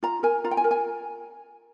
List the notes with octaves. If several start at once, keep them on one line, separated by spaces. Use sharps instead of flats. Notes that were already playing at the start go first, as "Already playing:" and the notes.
F4 A#5
A#4 G#5
F4 A#5
G5
G#5
A#4
G#5